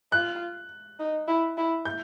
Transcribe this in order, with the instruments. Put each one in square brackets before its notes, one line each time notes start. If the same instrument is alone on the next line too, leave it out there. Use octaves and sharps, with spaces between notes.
[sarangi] F4 [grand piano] F#6
[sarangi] D#4
E4
E4
[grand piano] G6